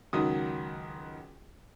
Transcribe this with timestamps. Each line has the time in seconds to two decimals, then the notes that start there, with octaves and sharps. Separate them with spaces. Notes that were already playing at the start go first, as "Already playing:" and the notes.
0.13 C#2 D#3 F#3 F#4 D#6